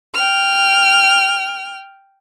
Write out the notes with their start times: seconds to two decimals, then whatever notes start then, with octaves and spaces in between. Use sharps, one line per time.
0.15 G5 F6